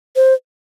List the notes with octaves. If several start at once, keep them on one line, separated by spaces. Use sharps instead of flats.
C5